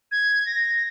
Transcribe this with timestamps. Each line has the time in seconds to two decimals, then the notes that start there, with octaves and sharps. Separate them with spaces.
0.12 G#6
0.46 A#6